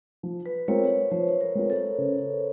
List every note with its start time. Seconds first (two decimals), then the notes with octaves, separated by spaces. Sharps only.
0.23 F3
0.46 B4
0.68 G#3 C4 F4 A#4 C#5
1.11 F3 C5
1.41 A#4
1.55 G#3 C4 F4 A#4
1.70 A4
1.98 C#3